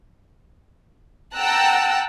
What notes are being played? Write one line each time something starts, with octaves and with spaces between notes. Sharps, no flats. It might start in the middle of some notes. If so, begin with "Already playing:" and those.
F#5 G5 A5 A#5 E6 F#6